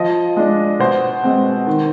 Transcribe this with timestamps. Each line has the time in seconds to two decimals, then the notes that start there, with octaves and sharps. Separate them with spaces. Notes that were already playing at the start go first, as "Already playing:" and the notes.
Already playing: F3 D#5
0.37 G#3 D4
0.79 B2 C5
1.23 G#3 C4
1.66 D#3